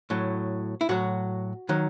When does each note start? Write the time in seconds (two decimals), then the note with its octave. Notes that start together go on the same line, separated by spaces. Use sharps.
0.10 A2 F#3
0.81 E4
0.89 A2 F#3 F#4
1.69 D#3 F#3